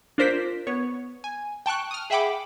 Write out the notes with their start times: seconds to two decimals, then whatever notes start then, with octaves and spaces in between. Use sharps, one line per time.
0.18 D4 F4 A#4 C5 D5 B6
0.67 B3 C#5
1.24 G#5
1.66 G5 A5 C#6 F#6
1.91 D#6 F6
2.10 G#4 E5 F#5 G5 B5 D6